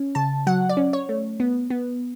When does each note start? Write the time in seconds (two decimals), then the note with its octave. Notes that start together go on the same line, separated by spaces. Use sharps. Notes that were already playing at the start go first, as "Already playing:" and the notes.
Already playing: C#4
0.15 C#3 A5
0.47 F#3 F#5
0.69 D5
0.77 C#4
0.93 C#5
1.09 A3
1.40 B3
1.70 B3